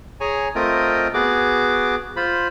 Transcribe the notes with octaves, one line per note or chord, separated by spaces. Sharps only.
G#4 C#5 G#5 A#5
A3 C4 F4 A#4 D#5 G5
B3 F#4 G#4 D6
F4 C5 B5